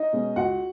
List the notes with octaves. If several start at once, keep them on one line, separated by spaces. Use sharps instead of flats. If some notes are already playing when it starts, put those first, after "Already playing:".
Already playing: D#4 D#5
B2 G#3 C#4
C#2 F#4 F#5